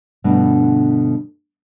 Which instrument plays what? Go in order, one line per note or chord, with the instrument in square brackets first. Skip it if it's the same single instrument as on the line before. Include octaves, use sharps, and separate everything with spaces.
[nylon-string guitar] G2 B2 D3 F3 A3 D4